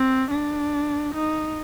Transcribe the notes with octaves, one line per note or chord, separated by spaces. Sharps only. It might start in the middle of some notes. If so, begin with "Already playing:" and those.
Already playing: C4
D4
D#4